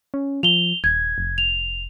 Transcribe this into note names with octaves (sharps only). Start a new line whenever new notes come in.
C#4
F3 F7 G7
D#1 G#6
F1
F7